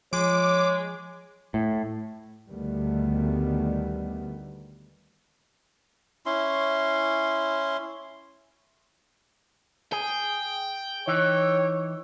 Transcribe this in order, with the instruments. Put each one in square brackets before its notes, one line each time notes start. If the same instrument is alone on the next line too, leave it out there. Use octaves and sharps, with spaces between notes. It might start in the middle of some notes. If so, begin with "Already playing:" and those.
[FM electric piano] F3 [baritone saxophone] G#3 [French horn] C#5 [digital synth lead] D6
[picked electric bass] A2
[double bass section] D2 D#3 G3 A3 B3
[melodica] C#4 E4 C6
[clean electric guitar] G#4 [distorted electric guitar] G5
[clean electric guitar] E3 D#4 [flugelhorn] C#5